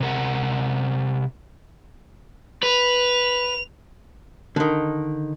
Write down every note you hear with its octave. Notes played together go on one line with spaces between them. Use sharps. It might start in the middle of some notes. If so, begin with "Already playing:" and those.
C3 A#4 F#5
B4 F7
D3 D#3